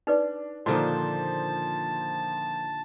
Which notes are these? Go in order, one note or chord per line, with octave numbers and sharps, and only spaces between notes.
D4 D#4 B4 D5
A#2 D3 D#3 F3 A#3 C5 A5